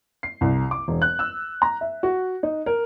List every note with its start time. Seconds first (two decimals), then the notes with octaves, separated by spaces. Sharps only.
0.23 C7
0.41 C2
0.71 D6
0.88 E1
1.02 F#6
1.19 E6
1.62 A#5
1.81 E5
2.03 F#4
2.43 D#4
2.66 A#4